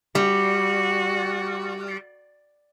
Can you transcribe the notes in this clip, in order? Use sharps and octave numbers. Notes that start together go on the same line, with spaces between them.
G3 F#4